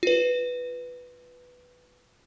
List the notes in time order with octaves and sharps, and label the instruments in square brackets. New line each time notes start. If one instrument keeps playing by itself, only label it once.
[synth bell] F4 B4